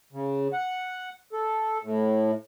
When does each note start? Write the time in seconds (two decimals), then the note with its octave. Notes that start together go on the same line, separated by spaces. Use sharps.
0.13 C#3
0.53 F#5
1.33 A4
1.83 A2